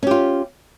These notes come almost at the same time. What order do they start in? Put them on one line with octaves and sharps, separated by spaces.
C#4 G4 F4